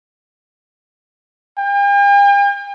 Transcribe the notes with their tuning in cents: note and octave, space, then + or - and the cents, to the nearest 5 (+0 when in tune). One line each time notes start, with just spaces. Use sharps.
G5 +45